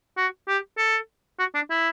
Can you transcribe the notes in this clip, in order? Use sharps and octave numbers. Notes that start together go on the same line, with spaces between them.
F#4
G4
A4
F#4
D4
E4